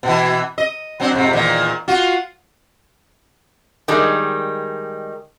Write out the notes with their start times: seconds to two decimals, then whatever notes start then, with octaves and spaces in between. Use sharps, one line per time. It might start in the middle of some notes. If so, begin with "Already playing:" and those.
0.03 B2 E3
0.58 D#5
1.00 F#3 C4 D4
1.13 F2 G#2 C3
1.33 E2 A#2 D#3
1.88 F4 F#4
3.88 D#3 G3 G#3